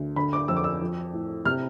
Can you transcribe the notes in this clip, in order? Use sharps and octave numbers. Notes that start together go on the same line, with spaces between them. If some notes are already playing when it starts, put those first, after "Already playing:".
Already playing: D2
D3 B5
D6
F2 E6
D6
E6
F3
A2
C3 F6